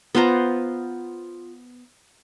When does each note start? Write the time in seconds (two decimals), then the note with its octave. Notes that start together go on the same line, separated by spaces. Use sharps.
0.15 B3 F4 C5 A#5